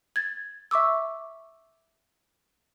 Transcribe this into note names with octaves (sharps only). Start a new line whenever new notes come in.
G#6 A6
E5 C#6 D6 E6